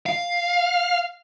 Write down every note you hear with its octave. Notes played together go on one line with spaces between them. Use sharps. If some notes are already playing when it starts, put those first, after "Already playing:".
F5